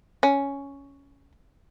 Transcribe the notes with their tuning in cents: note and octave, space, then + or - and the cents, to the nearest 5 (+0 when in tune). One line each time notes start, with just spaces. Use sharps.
C#4 +5